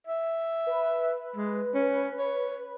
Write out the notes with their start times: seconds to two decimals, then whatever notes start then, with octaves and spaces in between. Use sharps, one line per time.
0.07 E5
0.67 B4
1.36 G#3
1.74 C#4
2.18 C#5